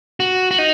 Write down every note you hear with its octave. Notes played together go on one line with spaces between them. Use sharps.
F#4
F#4
D#4